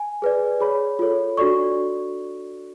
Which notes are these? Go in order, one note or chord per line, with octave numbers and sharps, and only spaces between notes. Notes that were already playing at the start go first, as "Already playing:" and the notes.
Already playing: G#5
G#4 B4 D5
G#4 C#5 B5
F4 A4 C#5
D4 F#4 A4 D5 C#6